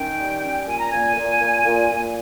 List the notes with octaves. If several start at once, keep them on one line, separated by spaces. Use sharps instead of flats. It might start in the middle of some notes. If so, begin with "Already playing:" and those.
Already playing: D#3 C#4 G5
G3
C#4
A#2 G#5
A#5
A#2 G#5
A#2
A#2
A#2
A#2